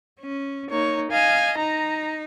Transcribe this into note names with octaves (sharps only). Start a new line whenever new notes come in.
C#4
A#3 D#4 C#5
D#5 F5 G#5
D#4 A#5